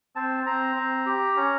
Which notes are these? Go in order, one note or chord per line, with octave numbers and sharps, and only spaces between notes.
C4 A5
C4 A#5
C4
G4
C#4